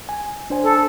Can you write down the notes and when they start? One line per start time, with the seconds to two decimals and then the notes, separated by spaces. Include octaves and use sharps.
0.09 G#5
0.50 D4 C5 G#5
0.63 A4